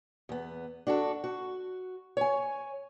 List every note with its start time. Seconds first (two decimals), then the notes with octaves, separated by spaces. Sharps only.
0.29 E2 B3
0.87 D4 F#4 G4 A4
1.24 F#4
2.17 C#5 G#5